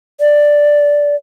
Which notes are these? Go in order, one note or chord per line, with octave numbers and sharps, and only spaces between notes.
D5